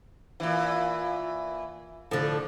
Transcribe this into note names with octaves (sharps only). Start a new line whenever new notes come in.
A#2 E3
A2 D3 F3